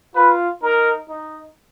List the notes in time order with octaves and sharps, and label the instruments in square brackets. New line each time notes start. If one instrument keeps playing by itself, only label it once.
[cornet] F4 [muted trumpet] B4
[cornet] D#4 [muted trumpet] A#4
[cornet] D#4